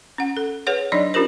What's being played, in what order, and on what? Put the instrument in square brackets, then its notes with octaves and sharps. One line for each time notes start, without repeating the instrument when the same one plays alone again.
[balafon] C#4 F#5
A4
G#4 B4 C#5 F#5
F#3 D4 D#4 D5 D#5
C#4 D4 F4 G4 A#4 C5